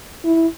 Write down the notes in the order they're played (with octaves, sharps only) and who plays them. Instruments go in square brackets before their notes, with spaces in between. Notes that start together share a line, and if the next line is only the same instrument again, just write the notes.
[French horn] E4